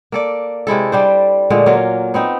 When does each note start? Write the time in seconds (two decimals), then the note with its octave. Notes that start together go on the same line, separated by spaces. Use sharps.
0.12 A#3 A4 D5
0.67 C3 G#3 E4 A4
0.92 G3 D4 C5
1.50 A#2 D3 G#3 A3
1.66 F#3 A#3 C#4 F4
2.14 B3 C4 D#4